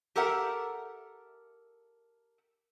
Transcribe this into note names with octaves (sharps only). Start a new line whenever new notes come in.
G4 A4 A#4 E5 F#5